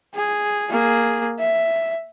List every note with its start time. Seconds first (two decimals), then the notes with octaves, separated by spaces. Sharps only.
0.15 G#4
0.70 A#3 G#4
1.39 E5